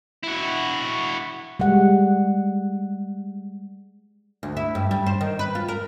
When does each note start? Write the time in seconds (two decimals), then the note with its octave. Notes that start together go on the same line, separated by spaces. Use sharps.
0.24 E4 F#4
1.60 G3 G#3 F#5
4.43 D2
4.57 E4
4.75 G2
4.91 G3
5.06 C5
5.21 D#3
5.39 B4
5.55 F4
5.68 A#4